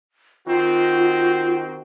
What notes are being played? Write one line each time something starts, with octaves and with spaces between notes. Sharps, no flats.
D#3 C4 F4 F#4